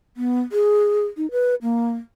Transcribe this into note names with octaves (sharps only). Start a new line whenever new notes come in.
B3
G#4
D#4
B4
A#3